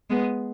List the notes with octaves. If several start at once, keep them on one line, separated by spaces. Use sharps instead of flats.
G#3 B3